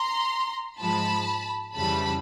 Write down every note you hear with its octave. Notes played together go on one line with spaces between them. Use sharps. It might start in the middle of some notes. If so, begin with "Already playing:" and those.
Already playing: A#5 C6
G#2 F3 G#3 A5 B5
F2 C#3 E3 G3 A5 B5